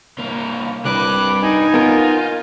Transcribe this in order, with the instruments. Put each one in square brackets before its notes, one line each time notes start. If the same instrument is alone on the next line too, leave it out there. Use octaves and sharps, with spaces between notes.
[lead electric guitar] C2 A#3
[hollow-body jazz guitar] C2 [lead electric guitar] D4 B4 [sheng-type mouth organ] D6 F#6
[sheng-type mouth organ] D#4 G#5
[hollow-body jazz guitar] B3 A#4 [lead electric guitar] F4